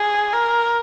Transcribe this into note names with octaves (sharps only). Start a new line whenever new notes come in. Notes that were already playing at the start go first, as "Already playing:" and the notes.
Already playing: G#4
A#4